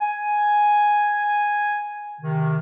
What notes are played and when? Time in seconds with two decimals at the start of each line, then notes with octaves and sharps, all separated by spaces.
0.01 G#5
2.21 C3 D#3